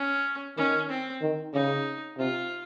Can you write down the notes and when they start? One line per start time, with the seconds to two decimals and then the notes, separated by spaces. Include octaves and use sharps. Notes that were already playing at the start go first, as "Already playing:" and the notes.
Already playing: C#4
0.57 D#3 C#4
0.90 C4
1.21 D#3
1.54 C#3 D#4
2.18 C3 F4